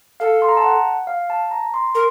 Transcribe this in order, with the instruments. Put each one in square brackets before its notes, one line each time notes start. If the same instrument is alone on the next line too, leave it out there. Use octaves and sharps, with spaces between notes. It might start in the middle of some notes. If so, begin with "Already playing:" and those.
[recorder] A4 [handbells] F5
[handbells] C6
A#5
A5
F#5
F5
A5
A#5
C6
[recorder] A#4 [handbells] C6